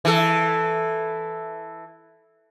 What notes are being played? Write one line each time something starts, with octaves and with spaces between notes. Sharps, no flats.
E3 A4